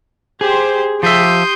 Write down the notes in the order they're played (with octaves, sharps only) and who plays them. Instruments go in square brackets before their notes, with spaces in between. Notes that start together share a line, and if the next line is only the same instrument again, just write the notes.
[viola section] G4 C5 [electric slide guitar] G#4
[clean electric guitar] F3 E5 [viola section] G4 [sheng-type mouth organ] C6 D#6 G6